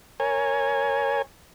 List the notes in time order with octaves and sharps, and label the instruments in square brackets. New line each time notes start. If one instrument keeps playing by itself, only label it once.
[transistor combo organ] A#4 C#5 G#5